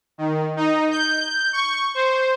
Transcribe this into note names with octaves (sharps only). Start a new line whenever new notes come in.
D#3
D#4
G6
C#6
C5